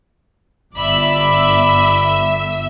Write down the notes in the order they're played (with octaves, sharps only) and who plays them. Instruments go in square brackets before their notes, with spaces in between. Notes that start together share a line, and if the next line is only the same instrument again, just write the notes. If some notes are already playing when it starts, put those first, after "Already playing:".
[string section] G1 E5 [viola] D5 B5